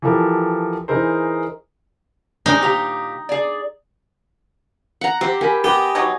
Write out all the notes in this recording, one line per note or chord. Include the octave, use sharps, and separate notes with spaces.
E3 F3 G4 A4 A#4
E3 D#4 G#4 A#4 C5
G3 G#3 C4 D#4
A#2 G4 A#5
G#4 D5
F#5 A#5
C4 G4 C5
G4 A#4 G#5 B5
B3 G4 D#5
B2 F#3 D#4 G#6